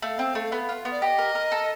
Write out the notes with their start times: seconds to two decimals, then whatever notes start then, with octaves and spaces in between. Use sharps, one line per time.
0.02 A3 F5
0.19 C4
0.35 A3
0.52 B3
0.69 F4
0.85 B3
0.91 D5
1.01 G4 D#5
1.18 A#4
1.35 A#4
1.52 A4